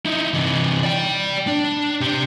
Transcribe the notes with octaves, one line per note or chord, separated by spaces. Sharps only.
D#4 E4
C3 E3
D5 G5
D4
C3 G4